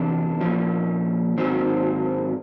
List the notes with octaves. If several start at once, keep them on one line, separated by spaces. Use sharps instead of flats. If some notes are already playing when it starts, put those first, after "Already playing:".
Already playing: E2 C3 E3 D4
A#2 F3 C#4
G#2 D#3 F#3 C4